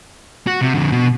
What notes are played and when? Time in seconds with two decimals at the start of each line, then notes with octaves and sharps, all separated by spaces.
0.47 F#4
0.61 C3
0.75 F2 D3
0.92 B2